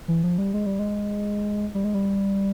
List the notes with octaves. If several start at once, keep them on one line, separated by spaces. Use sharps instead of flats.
E3
F3
G3
G#3
G3
G#3
G3
G#3
G3